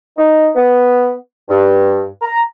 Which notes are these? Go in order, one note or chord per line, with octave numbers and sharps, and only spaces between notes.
D#4
B3
G2
A#5